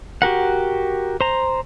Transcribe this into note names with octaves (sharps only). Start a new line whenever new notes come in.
F#4 G4 A#4 F#5
C5 A#5